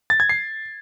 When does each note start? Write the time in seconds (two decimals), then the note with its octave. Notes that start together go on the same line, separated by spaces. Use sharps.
0.10 A6
0.20 G#6
0.29 C7